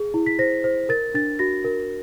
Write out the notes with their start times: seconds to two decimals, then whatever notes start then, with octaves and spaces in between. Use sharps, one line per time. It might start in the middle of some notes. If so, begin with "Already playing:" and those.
Already playing: G#4
0.14 E4
0.26 B6
0.39 C5 A#6
0.64 C5
0.89 A#4 A6
1.14 D4 A6
1.39 F#4 A#6
1.64 A#4